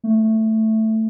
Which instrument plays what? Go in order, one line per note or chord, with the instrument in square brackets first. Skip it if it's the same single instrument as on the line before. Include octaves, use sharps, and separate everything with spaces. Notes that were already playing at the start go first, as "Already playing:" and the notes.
[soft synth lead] A3